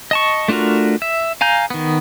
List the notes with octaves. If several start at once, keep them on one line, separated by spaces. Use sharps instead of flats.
D#5 A5 C#6
A3 D4 F4 F#4 A#4
E5
F5 G#5 A#5 G6
D#3 B3